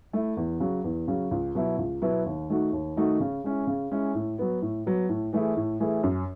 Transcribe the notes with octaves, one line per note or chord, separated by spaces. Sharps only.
A3 E4
E2
C#3 F#3
E2
C#3 F#3
C#2
B2 F#3 B3 E4
C#2
B2 F#3 B3 E4
D#2
D#3 A3 D#4 F#4
D#2
D#3 A3 D#4 F#4
C#3
G#3 C#4 E4
C#3
G#3 C#4 E4
A2
F#3 B3
A2
F#3 B3
A2
E3 A3 E4 G#4
A2
E3 A3 E4 G#4
F#2